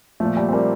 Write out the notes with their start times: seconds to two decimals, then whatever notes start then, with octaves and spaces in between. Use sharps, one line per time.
0.20 A#2 F3 A3
0.37 G3
0.49 C4
0.53 G3 A#3